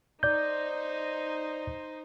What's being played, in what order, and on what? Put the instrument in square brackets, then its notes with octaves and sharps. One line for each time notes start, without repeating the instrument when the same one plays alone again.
[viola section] D#4 C5 [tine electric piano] D5 G6